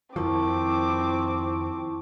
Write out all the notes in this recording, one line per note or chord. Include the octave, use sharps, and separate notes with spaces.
F2 D#3 F3 C4 E4 A5 C#6 D6